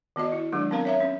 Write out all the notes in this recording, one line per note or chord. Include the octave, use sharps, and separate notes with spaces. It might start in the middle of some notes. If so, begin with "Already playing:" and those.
D#3 B3 F#4 D#5
E4
D#3 F#3 G#3 D4
B3 C4 A#4 F5 A#5
C#5 E5 A#5
C#4